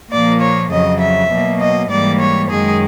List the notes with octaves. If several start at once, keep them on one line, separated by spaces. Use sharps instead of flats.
A#2 F3 A#3 D5
C#5
F2 C#3 F#3 D#5
E5
B2 F#3 A#3
D#5
G#2 E3 G3 A#3 D5
C#5
F#2 D#3 G#3 G#4